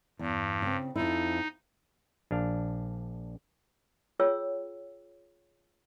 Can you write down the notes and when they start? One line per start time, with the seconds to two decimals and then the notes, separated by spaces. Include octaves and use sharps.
0.19 E2 G2
0.62 C#3 C4
0.96 F2 F3 D#4 E4
2.31 A#1 D4 F5
4.20 F4 G#4 C#5 G5 E6